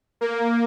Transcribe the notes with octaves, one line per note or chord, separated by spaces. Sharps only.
A#3